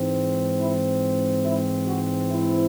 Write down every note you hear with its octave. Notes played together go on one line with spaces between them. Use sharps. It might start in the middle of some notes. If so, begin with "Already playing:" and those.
Already playing: G#2 E3 C4
E4
E4
F#4
E4